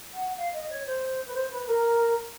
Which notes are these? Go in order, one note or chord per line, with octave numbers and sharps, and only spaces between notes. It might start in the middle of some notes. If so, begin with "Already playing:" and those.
F#5
F5
D#5
C#5
C5
B4
C5
B4
A#4